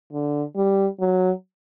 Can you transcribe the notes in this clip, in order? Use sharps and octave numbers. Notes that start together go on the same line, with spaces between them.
D3
G3
F#3